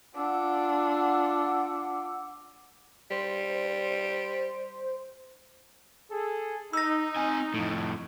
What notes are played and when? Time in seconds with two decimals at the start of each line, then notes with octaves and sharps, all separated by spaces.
0.15 D4 F4 F#5 D6 E6
3.11 G3 C5
6.10 G#4 A4
6.73 D#4 E6 A#6
7.17 C4 G#5
7.54 F2 A2